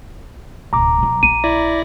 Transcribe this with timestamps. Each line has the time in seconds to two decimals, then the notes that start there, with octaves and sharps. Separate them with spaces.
0.73 D1 B2 A#5 D6
0.98 B2 F#3
1.23 A#1 D#7
1.44 E4 D5 A#6